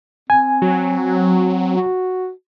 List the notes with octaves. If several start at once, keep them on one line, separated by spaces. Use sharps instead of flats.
C4 G#5
F#3
F#4